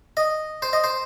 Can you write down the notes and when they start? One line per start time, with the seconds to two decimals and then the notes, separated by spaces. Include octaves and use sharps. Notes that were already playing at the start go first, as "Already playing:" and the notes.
0.17 D#5
0.62 C5
0.73 D#5
0.84 C5